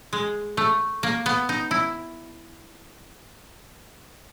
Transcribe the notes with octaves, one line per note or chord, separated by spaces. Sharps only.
G#3
A3
A#3
B3
D#4
E4